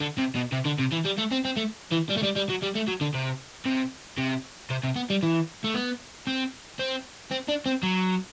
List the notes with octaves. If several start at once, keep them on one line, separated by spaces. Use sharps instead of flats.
D3
C3
B2
C3
D3
C3
E3
G3
A3
C4
C4
A3
E3
G3
A3
G3
G3
F#3
G3
A3
F#3
D3
C3
C3
C3
C3
C3
B3
G3
E3
A3
B3
C4
C4
C4
D4
C4
F#3